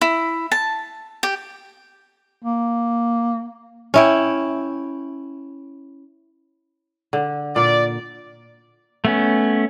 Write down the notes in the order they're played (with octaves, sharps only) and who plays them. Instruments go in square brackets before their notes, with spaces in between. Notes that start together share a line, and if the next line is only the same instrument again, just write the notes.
[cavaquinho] E4
A5
G4
[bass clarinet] A#3
[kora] C#4 E4 G5
D3
[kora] A#2 [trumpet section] D5
[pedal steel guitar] A3 B3 C#4